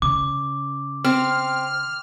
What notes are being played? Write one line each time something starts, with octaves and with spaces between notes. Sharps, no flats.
C#3 D6
C4 F6